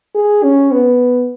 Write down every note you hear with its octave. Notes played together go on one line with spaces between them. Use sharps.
G#4
C#4
B3